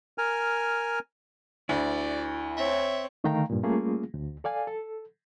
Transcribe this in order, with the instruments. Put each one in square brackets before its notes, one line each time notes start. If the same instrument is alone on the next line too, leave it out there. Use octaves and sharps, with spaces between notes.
[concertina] A#4 G#5 F6
[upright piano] D2 [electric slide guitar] E4 [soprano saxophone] D5
[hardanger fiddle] C4 C#5 [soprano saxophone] E5
[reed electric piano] D3 D#3 A3 F5 G5 A#5
G2 A#2
G3 A3 A#3 C#4 F4 G#4
D2
A4 D5 F5 G#5
A4